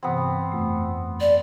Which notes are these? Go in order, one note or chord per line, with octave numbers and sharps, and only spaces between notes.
G2 C3 E3 B3 C4
F2 A3
D5